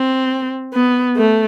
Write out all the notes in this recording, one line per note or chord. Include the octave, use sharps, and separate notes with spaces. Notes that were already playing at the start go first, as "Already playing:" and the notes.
Already playing: C4
B3
A3